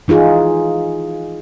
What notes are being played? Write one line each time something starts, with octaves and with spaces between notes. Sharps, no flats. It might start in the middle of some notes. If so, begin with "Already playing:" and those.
E3 D#4 F4 G#4